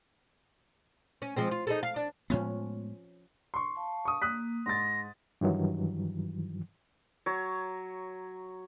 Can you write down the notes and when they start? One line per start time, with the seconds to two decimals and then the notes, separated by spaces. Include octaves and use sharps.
1.22 C#4
1.36 F3 G#3 C4
1.51 F4
1.67 D#4 G#4 A4
1.83 F5
1.96 D4
2.30 A2 F3 G#3 B3 C#4
3.54 C6 C#6
3.76 F5 A5
4.05 C#6 D#6
4.22 A#3 D#6 F#6 B6
4.66 G#2 C6 A6 A#6
5.41 G2 D#3 E3 F#3
7.26 F#3 C#5